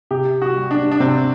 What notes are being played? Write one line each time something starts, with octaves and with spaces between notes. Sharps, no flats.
C3 G4
F#4
G3
D4
D4
C3 C4